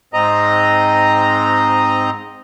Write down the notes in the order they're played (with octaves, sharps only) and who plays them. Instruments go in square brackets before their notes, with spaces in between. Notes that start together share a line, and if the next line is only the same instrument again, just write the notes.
[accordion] G#2 C4 D#5 A#5